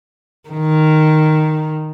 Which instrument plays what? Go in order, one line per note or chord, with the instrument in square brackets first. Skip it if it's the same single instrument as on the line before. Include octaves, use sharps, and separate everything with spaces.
[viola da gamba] D#3